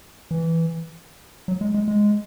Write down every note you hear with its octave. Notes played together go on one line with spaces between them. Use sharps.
E3
F#3
G#3
G#3
G#3